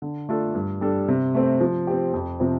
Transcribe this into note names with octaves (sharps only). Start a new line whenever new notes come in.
D3
A3 D4 F4 A4
G2
G3 D4 A4
C3
A3 C4
F3
C4 G4
F2
C3 F3 C4